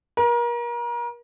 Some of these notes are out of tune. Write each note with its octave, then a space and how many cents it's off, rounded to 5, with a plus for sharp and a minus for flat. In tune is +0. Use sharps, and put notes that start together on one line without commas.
A#4 +35